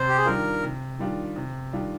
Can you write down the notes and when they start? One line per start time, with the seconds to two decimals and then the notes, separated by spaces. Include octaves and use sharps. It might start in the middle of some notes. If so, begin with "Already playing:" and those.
Already playing: C3 C5
0.08 G4
0.17 G#4
0.25 D#3 G3 D4 F4 A#4
0.63 C3
0.99 D#3 G3 D4 F4
1.36 C3
1.73 D#3 G3 D4 F4